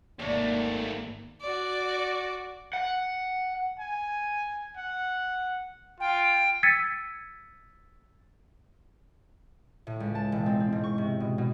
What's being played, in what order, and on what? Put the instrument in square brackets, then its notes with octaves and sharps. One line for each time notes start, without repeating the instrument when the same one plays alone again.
[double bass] G#1 A#3 [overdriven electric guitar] D#2 A3 [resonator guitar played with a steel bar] C3 C#5 D5
[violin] F#4 D5
[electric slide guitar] F#5
[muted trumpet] G#5
F#5
[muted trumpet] F4 [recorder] G5
[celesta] E6 G#6 A6 B6 C#7 D#7
[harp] A2
C#2
A5
E1
C4
C4
G#2
C#6
C3
B2
B2